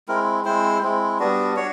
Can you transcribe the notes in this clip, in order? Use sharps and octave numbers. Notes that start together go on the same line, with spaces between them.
G#3 C4 E4 A#4
G#3 C4 E4 C5
G#3 C4 E4
G3 B3 D4 F#4
D4 F#4 C#5